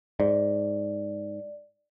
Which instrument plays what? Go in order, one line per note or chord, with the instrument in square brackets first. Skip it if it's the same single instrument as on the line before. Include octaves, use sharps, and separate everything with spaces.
[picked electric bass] G#2 [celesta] D5